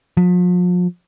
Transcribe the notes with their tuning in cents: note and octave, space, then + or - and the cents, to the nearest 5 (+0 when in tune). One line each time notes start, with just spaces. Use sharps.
F3 +40